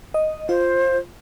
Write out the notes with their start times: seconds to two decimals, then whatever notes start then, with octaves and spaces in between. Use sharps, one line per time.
0.14 D#5
0.49 F4 C5